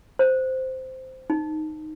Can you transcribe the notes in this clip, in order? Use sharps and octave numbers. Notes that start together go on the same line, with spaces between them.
C5
D#4